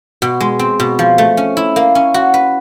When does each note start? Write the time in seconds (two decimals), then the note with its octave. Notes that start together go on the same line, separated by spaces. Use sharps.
0.22 B2
0.41 G#3
0.59 C4
0.80 B2
0.99 F3
1.18 A3
1.37 C#4
1.57 E4
1.76 A#3
1.95 C#4
2.14 F#4
2.34 B4